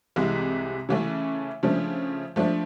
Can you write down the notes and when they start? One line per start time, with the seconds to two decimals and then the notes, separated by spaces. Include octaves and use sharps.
0.16 C2 C3 E3 G#3
0.89 C#3 E3 A3 C#4
1.63 C#3 F3 A3 D4
2.36 F3 A3 D4